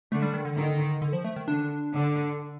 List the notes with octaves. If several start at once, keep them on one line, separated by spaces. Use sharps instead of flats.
D3 A3
G3
D#3
D3
D#3
D3
F3
A3
D#3
D3 D4
D3